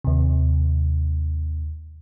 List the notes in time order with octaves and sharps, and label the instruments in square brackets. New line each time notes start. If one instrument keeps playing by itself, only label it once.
[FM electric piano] D#2 C3